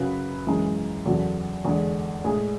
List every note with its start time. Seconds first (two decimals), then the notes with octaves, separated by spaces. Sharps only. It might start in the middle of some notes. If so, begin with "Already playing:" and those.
Already playing: F#2 C#3 F#3 B4
0.47 F#2 E3 G#3
1.05 E2 C#3 F#3 A4
1.65 E2 D3 G#3
2.24 A2 G#3 G#4